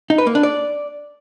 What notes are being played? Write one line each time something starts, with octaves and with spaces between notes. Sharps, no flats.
D#4
B4
A#3
D4
D5